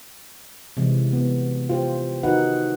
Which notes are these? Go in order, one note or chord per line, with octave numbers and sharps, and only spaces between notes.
C3 E3 G#3
B3
F4 G4 C5
D#3 D#4 F#4 B4 F#5